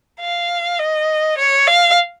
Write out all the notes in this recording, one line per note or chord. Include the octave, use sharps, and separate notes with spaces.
F5
D#5
C#5
F5